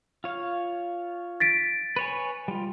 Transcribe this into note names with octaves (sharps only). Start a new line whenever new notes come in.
F4 C#5 F5
A6 B6 D7
B4 C#5 G#5
G3 F4